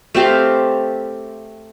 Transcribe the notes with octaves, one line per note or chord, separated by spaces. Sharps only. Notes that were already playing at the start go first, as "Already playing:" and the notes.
A3 C4 G4 F5